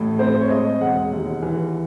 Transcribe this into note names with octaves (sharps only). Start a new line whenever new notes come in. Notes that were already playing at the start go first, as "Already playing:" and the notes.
Already playing: A1 A2
C4 C5
C#5
G#3 D#5
E1 F#5
D#2
E3